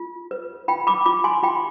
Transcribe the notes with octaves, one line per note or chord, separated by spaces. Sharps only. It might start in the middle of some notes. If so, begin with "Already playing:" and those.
Already playing: F4
B4
F4 G5 B5
B5 D6
F4 B5 D6
G#5 C6
F4 G5 B5